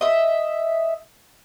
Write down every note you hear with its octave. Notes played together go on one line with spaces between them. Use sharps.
D#5 E5